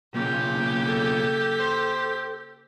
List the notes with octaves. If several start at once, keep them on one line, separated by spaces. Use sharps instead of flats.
B1 A#2 C#3 A#3 G4
A4
C5